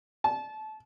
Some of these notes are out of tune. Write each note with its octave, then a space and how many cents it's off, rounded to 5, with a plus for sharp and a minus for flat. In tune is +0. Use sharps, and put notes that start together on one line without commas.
A5 -25